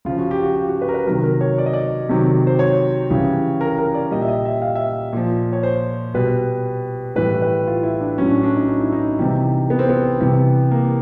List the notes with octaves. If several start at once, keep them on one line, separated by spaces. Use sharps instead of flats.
C#3 F3 F4
F#4
G4
F#4
G4
F#4
B4
A#4
B4
C3 D#3 F#3 A#4
A#4
C#5
D5
D#5
D5
C3 D#3 F#3
C5
C#5
C#3 E3 G3
A#4
A#4
D5
A#2 G3 D#5
E5
D#5
E5
F5
E5
A#2 F3
C#5
C5
B2 G3 B4
A2 E3 G3 B4
B4
F4
E4
D4
A2 F#3 C#4
D4
D4
D#4
D#4
E4
D#4
C3 E3 G3
B3
C4
B3
C3 E3 G3
A#3